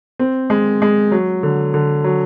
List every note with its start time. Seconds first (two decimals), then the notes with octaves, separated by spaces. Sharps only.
0.19 C4
0.50 G#3
0.82 G#3
1.12 F#3
1.43 D3
1.74 D3
2.04 F#3